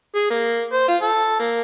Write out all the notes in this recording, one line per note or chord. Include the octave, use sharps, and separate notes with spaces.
G#4
A#3
C5
F4
A4
A#3